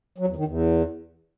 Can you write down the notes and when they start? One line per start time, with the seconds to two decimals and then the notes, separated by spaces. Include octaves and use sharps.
0.18 F#3
0.27 E2
0.36 D#3
0.45 E2